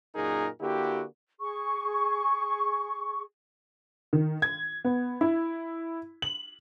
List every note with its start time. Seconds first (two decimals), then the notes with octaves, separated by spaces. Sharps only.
0.16 F#2 A#2 D#4 F#4 G#4 A#4
0.61 D3 A#3 E4 F#4 G4
1.40 G#4 C#6
4.13 D#3
4.42 G#6
4.85 B3
5.21 E4
6.22 F#7